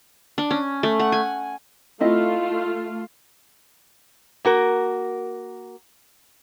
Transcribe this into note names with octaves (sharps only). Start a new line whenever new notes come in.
D4
C#4
A3
F#5
G#5
A3 C4 E4 F4 D#5
A#3 F#4 A#4